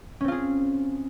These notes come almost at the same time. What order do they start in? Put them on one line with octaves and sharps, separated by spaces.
C#4 C4 F4 G#4